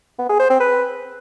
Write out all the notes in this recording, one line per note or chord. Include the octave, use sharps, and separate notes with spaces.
B3
G#4
C5
C4
B4